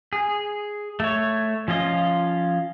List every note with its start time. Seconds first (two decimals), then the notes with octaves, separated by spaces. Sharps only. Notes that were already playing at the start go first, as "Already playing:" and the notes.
0.13 G#4
1.00 A3 C#5
1.68 F3 C#4 F4 D#5